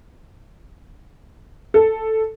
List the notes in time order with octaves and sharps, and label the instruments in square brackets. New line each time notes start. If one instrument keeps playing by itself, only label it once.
[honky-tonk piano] A4